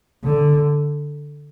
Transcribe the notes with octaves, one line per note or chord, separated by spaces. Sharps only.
D3